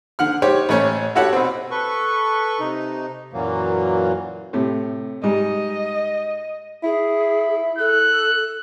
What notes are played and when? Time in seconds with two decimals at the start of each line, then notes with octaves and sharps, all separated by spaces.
0.19 D3 F#5 F6
0.42 D#4 G4 C5 C#5
0.69 A1 A3 C#4 C#5
1.15 E4 F#4 G4 A4 C#5 F#5
1.33 B2 C4
1.71 A4 B4 C#6
2.60 C3 D#4
3.33 F#2 A#2 E3 F#3 A#3
4.53 A2 C3
5.23 G#2 G3 D#5
6.83 E4 G#4
7.78 A4 F#6